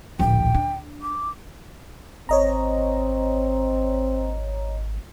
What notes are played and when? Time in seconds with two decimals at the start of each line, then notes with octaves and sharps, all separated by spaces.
0.19 D1 A#1 G5
0.55 D4
1.02 D6
2.29 G#1 C4 C#5 D#5 A#5